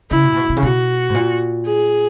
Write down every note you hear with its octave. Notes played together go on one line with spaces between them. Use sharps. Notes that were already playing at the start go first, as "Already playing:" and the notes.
C#3 E4
B2
A#2
B2
B2
C#3
B2 F#4
G#2
A#2
G#4